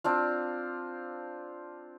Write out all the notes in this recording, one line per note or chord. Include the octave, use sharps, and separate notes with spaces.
C4 D4 F4